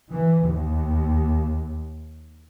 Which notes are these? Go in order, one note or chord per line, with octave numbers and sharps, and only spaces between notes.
E3
D#2